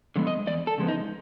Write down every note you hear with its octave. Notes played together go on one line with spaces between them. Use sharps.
D3 F3 G#3 B3
D#5
E2 D5
A4
C#3 F3 G#3 B3
D#4